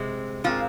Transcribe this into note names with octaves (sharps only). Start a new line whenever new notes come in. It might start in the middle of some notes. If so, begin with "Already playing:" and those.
Already playing: C3 G#3 C4
A#2 G#3 C4 F4